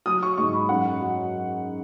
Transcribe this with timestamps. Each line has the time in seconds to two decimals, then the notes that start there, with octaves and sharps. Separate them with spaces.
0.06 F#3 D#6
0.23 C#6
0.37 G#2 C#6
0.53 B5
0.69 F#2 F#5
1.01 F#3